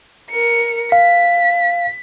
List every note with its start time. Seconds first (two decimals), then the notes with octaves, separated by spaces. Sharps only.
0.30 A#4 C#7
0.92 F5 B6